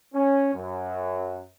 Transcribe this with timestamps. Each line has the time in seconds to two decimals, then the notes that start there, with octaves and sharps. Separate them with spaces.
0.14 C#4
0.53 F#2